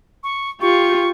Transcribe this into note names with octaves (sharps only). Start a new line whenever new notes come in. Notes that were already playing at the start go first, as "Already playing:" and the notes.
C#6
F4 G4 C#6